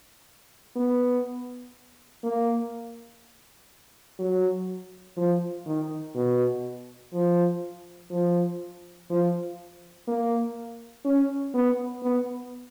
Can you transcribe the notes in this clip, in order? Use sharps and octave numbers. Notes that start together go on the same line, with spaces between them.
B3
A#3
F#3
F3
D#3
B2
F3
F3
F3
A#3
C#4
B3
B3